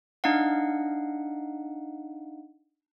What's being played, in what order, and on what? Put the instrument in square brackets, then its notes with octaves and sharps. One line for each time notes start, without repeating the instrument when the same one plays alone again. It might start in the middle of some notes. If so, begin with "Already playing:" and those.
[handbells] D4 D#4 D#5 F5 F#5